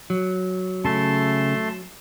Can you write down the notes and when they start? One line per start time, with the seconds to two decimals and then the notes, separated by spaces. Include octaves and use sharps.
0.10 F#3
0.85 C#3 A3 E5 A5 C6